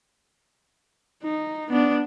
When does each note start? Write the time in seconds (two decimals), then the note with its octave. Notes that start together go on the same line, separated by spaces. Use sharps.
1.24 D#4
1.69 B3 D4